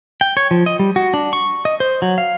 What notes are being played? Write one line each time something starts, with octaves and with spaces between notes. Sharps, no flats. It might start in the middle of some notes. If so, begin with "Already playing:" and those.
G5
C#5
F3
D#5
G3
F#4
D4
C#6
D#5
C5
F#3
F5